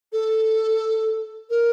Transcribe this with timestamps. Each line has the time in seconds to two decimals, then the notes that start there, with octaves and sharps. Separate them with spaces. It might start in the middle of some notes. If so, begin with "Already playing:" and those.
0.13 A4
1.50 A#4